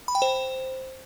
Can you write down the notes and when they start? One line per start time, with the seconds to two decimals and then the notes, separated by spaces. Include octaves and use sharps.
0.08 B5
0.15 G5
0.22 C5